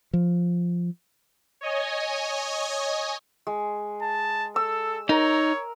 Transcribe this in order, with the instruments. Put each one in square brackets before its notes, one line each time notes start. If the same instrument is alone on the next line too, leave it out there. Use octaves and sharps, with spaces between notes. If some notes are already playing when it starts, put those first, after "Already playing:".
[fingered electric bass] F3
[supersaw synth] C#5 D#5 G#5
[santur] G#3
[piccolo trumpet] A5
[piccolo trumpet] A4 [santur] E6
[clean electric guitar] D#4 [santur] A#4 [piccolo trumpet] C#5